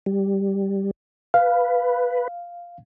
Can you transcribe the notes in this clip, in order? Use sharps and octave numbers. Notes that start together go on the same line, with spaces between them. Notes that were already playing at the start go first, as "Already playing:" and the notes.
G3
B4 F5